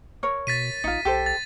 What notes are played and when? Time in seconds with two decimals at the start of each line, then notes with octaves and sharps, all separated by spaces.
0.23 A#4 C#5
0.47 B2 A6 B6 D#7
0.84 A#1 D#4 F4
1.05 B1 G4 A4 C5
1.26 A6